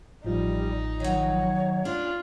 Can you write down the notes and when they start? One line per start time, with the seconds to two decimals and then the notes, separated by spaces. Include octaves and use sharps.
0.25 A1 F3 G3 D#4
1.00 D#3 F#3 C#5
1.85 D4 F4